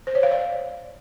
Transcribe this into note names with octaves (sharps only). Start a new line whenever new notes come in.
C5
C#5
F5
D5